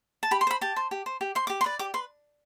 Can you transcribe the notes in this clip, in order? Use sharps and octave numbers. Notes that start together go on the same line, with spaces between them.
A5
G4 B5
C6
C5 B5
G4 A5
C5
G4
C5
G4
C5 C6
G4 D6
C6
B4 D5
G4 D6
B4 C6